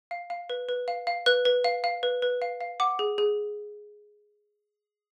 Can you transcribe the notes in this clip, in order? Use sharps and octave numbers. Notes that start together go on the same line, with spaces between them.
F5
F5
B4
B4
F5
F5
B4 F#6
B4
F5
F5
B4
B4
F5
F5
F#5 D6
G#4
G#4